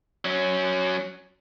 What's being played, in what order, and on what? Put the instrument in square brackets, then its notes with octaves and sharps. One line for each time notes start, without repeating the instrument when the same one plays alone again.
[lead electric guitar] F#3 C#4